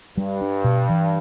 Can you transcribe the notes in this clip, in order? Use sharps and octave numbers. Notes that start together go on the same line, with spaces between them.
G2 G3
D4
B2
E3